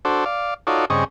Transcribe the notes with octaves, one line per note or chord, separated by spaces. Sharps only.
D4 F#4 A4 C5
D5 F5
D#4 F4 F#4 A4 C#5 D5
G2 C#3 C4 G#4 D#5 C#6